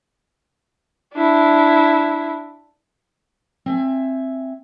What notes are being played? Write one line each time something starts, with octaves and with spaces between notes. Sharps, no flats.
D4 E4
C4 E5 G#5